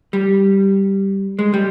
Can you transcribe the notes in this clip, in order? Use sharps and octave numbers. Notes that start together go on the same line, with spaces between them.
G3
G#3
G3